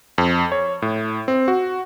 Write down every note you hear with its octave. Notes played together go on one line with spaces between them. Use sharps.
F2
C#5
A2
C4
F#4